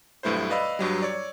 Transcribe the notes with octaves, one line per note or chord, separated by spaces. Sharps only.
B1 G2 A3 E4 B4 C5
B4 D5 D#5 F5 B5 E6
G2 F#3 G3
C#5 D5